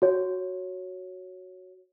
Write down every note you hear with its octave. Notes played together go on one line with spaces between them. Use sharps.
F#4 C#5